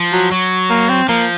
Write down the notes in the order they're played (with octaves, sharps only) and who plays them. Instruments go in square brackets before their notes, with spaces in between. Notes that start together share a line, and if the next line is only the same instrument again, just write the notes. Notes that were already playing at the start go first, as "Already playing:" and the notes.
Already playing: [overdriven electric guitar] F3
[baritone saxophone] F#3
[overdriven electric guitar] F#3
[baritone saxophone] A#3
C4
[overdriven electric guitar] F3 [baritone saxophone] A#3